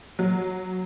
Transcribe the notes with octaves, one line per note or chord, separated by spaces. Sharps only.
F#3